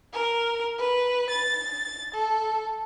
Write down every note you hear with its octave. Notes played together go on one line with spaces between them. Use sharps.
A#4
B4
A6
A4